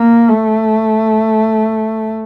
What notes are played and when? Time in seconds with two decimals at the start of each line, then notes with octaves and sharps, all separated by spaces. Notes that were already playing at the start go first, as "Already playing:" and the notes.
Already playing: A#3
0.28 A3